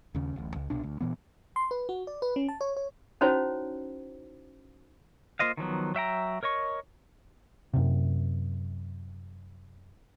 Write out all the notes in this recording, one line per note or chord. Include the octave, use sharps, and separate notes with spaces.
D#2 C#3
D1 A1
C#2
C2 B2 D4
D2
A#2 E3 B3
C6
B4
F#4
D5
B4
C#4
A5
C#5
C#5
C#4 D#4 E4 F#4 C5 C#5
A#3 F4 C5 D#5 F5
D#3 F3 F#3 B3
F#3 E5 G5 A#5
A#4 C#5 D#5 C#6
F#2 C3